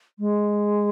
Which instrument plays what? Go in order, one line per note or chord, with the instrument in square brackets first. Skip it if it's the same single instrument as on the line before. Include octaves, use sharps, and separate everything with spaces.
[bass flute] G#3